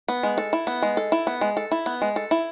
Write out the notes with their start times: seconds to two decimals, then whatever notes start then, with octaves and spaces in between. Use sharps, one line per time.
0.08 B3
0.23 G#3
0.38 A4
0.53 E4
0.67 B3
0.82 G#3
0.97 A4
1.12 E4
1.27 B3
1.41 G#3
1.57 A4
1.71 E4
1.86 B3
2.02 G#3
2.16 A4
2.31 E4